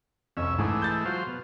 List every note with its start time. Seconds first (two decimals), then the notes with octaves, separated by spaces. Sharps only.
0.37 C2 F2 C#4 E5
0.58 G#2 E3 G#3 A3 D6
0.82 G6 A6
1.05 F#3 F4 C5
1.27 B2